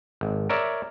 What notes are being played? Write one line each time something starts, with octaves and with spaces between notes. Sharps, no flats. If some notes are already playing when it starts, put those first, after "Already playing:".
G#1
A#4 C#5 D5 E5